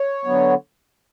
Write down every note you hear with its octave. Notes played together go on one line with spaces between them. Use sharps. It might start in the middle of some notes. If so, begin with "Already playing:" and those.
Already playing: C#5
D3 F#3 B3